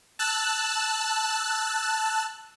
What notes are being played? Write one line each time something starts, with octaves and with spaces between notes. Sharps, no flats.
A5 E6 F#6